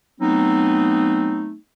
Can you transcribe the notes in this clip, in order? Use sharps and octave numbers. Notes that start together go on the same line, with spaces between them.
F#3 A3 B3 C4 D#4